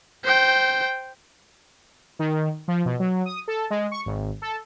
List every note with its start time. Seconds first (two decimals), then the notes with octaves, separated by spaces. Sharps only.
0.24 C5 G5
2.19 D#3
2.68 F3
2.85 B2
3.00 F#3
3.26 D#6
3.48 A4
3.70 G#3
3.91 C#6
4.06 G#1
4.42 A4